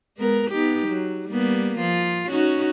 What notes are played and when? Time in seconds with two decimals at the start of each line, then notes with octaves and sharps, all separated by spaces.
0.17 G#3 B3 A#4
0.51 B3 D#4 G4
0.88 F#3
1.29 G3 A#3 B3
1.79 F3 F4
2.29 C#4 D#4 F#4